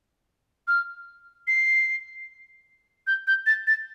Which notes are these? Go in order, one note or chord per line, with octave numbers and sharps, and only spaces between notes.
F6
C7
G6
G6
A6
A6